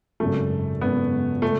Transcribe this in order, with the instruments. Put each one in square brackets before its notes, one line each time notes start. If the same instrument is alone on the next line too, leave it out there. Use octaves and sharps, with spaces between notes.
[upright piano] G#1 F#2 C#3 [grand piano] A3
[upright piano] G#1 F#2 C#3 [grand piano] B3
[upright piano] C#3 G#3 [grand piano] A3